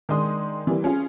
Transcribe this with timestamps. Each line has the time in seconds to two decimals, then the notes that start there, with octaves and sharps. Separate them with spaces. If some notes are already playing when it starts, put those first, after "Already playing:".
0.09 D#3 G#3 D4 C6 D#6
0.67 E3 G3 A#3
0.84 C#4 F4 G#4